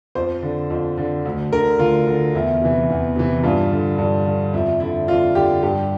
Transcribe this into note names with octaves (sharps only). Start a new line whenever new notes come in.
F2 C5
D3
F2
D3
D2
D3 A#4
D2 F4
D3
E2 E4
C3 E3
E2
C3 E3
G2 F4
D3
G2
D3
F2 E4
D3 E4
F2 F4
D3 G4
G2 G4